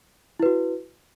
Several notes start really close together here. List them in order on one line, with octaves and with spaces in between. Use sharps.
E4 B4 F#4